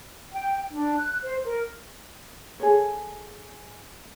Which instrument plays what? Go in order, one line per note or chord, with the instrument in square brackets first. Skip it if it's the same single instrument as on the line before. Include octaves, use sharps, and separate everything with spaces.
[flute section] G5
D4
F#6
C5
A#4
[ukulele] G#4 A4 C#5